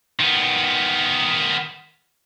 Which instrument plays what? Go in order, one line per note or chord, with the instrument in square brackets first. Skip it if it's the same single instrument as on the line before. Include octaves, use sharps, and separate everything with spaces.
[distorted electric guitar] D#3 B3